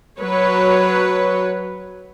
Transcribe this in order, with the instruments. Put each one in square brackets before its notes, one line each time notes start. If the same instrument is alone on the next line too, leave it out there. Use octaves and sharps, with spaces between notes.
[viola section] F#3 B4 C#5